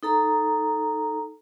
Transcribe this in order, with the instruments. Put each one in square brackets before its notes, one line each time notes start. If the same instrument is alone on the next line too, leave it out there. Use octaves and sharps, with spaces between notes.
[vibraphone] D#4 A4 A#5